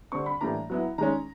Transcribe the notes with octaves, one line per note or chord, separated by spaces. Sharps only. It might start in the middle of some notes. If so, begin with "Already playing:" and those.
D3 G3 C4 C#6
B5
A2 E3 G3 A#3 D4 A#5
F#3 B3 E4
D#3 G#3 C#4 A#5